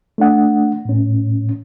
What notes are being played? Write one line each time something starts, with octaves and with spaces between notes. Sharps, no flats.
A3 D4 F#5
A2 C#4